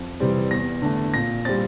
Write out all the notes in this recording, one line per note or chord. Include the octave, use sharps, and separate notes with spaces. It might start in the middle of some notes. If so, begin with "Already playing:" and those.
Already playing: F2
C3 E3 G3 C4
E2 A#6
D3 A3
A#2 A#6
G3 C4 A6